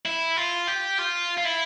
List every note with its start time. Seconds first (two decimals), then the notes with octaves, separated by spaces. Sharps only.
0.05 E4
0.37 F4
0.68 G4
0.99 F4
1.38 F4
1.45 E4